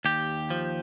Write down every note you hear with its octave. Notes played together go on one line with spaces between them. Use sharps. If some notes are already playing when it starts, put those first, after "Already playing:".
D#2 G4
F3